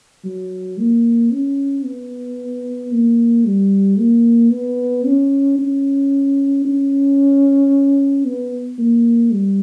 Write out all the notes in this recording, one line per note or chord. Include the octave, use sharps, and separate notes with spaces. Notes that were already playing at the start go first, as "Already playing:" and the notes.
F#3
A#3
C#4
B3
A#3
G3
A#3
B3
C#4
C#4
C#4
B3
A#3
G3